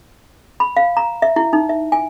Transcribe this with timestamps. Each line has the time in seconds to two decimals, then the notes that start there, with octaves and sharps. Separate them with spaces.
0.60 B5
0.77 F5
0.97 A#5
1.22 E5
1.36 E4
1.53 D#4
1.69 E5
1.92 G#5